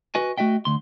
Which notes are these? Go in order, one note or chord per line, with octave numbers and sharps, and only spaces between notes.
F#4 B4 D#5 G#5
A3 F#4 D#5 E5 G5
D2 C6